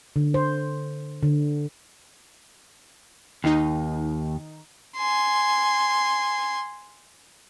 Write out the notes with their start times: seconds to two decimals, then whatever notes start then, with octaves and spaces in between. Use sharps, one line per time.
0.16 D3
0.34 C5
1.23 D3
3.44 D#2 D#3 D#4
4.97 G#5 C6